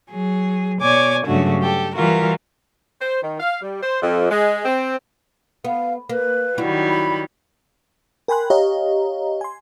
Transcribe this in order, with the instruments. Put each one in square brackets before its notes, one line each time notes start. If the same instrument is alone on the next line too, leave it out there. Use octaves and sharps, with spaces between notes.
[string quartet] F#3 G#4
B2 C#5 D5 G#5 D6
G2 C#3 F#3 A3 D4 F#4
G4 A4
E3 G3 F4 F#4 A#4
[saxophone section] C5
D#3
F5
G3
C5
F2
G#3
C4
[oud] B3 [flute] F5
[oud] A#3 [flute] B4
[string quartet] D#3 F#3 G3 [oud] E4 F#4
[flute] B5
[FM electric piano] A#4 G5 G#5 B5 C6 F#6
G4 C#5 D#5 F5 A#5
G#5 C6